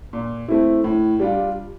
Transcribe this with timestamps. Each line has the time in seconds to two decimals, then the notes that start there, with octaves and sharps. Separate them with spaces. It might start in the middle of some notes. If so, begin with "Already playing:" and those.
0.13 A#2
0.48 A3 C4 E4
0.84 A2
1.19 G3 D4 F4